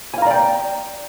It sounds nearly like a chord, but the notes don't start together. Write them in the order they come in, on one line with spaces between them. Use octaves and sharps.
G#5 F5 A#5 D5 G5